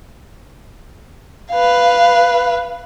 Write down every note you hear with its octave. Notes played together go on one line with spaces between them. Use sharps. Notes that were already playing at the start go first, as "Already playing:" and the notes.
B4 F5